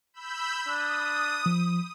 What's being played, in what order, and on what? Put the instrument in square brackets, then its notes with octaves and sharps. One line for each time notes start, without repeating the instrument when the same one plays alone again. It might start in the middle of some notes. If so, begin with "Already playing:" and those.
[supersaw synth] B5 E6 G6
[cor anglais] D4 [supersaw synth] D#6
[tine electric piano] F3